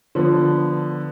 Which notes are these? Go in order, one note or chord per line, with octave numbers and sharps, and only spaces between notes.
D3 F3 B3